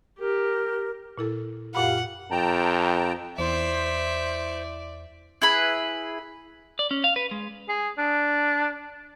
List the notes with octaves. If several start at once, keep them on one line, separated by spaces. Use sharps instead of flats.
G4 A#4
A#2 E4 A4
F#2 A#2 F4 G4 F5 F#5 B5
F2 G5 A5 A#5
E2 E4 C5 D5 E5
E4 G#4 B4
D5
C#4
F5
B4
G#3
G#4
D4